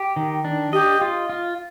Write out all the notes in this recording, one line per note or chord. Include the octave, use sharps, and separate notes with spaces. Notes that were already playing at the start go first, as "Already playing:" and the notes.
Already playing: G4
D#3
D4
G4 D#5
F4
F4